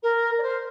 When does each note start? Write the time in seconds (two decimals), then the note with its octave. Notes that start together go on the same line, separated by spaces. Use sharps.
0.02 A#4
0.38 D5
0.42 C5